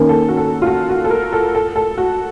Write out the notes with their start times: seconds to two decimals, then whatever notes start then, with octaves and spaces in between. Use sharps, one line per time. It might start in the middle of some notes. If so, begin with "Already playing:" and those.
Already playing: D#3 A#3 C#4
0.09 A4
0.29 F#4
0.37 A4
0.62 F4
0.67 F#4
0.89 F#4
1.04 A4
1.10 A#4
1.33 A4
1.55 A4
1.76 A4
1.98 F#4